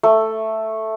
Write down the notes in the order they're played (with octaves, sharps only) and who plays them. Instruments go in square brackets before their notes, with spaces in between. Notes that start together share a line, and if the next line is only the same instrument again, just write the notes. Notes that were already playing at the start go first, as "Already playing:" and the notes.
[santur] A3